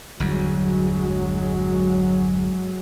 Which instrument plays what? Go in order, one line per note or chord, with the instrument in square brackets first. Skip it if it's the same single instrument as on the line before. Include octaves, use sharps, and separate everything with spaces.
[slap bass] G1 E2 [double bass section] F#3 G#3